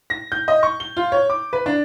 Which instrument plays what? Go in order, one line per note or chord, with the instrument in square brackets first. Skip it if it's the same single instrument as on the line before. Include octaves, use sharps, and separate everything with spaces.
[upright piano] A#6
G6
D#5
C#6
G7
F4
C#5
D6
B4
D4